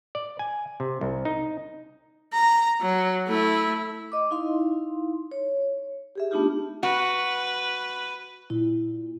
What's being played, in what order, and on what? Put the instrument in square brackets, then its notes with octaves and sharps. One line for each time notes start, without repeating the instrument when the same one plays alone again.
[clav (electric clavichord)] D5
G#5
C3
C2
D#4
[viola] A#5
F#3
A3 E4
[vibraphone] D#5 D6
D#4 E4 F5 C6
C#5
G4 G#4 E5
A3 B3 D4 D#4 F4 G4
[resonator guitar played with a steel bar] F#4 [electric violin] B4
[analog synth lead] A#2 [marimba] E4